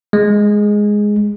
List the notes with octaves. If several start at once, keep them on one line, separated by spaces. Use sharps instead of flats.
G#3